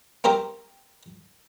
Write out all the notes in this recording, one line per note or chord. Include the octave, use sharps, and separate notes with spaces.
A#3 C4 G4 A#4